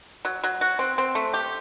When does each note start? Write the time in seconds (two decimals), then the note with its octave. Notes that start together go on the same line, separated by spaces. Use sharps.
0.25 F#3
0.44 F#3
0.61 F#4
0.79 C4
0.98 C4
1.15 A3
1.34 G4